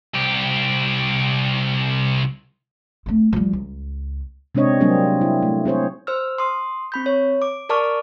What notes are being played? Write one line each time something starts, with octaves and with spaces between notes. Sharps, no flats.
C2 G4
A3 C4
F3 G3
C#2
C3 G#3 C4 D4 C#5 D#5
F#3 G3 A#3 C4 D4 G#4
E4
A3
C4 G#4 C5 C#5
C5 E6 F6
C6 D#6
C4 B5 G6
C#5
D6
A#4 D5 A5 C#6 D6 F6